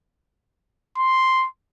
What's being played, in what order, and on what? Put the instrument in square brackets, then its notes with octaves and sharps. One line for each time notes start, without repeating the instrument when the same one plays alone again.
[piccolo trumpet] C6